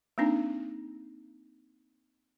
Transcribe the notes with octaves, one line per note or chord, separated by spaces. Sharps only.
A#3 C4 D4 D#4